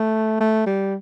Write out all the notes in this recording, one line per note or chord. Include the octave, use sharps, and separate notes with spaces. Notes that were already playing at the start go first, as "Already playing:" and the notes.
Already playing: A3
A3
G3